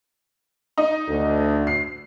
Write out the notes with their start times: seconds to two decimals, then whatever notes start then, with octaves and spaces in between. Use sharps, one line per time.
0.77 D#4
1.08 D2
1.67 C7